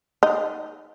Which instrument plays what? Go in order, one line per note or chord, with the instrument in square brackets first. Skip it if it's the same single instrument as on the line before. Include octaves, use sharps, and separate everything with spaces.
[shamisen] D#4